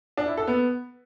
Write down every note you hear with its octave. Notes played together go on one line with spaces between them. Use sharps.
D4
E4
A4
B3